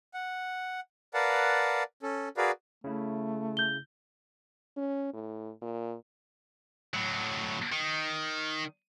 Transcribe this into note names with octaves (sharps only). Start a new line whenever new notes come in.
F#5
A#4 B4 D5 F5 F#5 A5
C#4 A4
F#4 G#4 A#4 B4 D5 F5
C#3 A3 E4
G6 G7
C#4
A2
A#2
A2 F#3
D#3